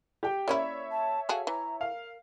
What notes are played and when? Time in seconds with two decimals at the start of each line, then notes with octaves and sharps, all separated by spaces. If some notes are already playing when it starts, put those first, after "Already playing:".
0.23 G4 G5
0.48 A#3 C#4 E4 C#5 D5 E5
0.90 A5
1.29 F#4 G#4 A4 F5
1.47 E3 A#5
1.81 A#4 F5